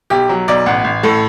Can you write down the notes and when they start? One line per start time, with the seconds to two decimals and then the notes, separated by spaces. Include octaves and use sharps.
0.10 B1 G4
0.29 F#3
0.48 B1 D5
0.66 A1 F#5
0.84 A1
1.03 A2 A4